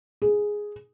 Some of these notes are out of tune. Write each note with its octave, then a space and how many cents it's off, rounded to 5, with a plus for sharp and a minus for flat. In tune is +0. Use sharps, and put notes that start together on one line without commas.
G#4 +0